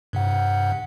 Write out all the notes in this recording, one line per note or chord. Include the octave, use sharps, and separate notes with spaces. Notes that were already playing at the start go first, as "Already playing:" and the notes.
G2 C3 F#5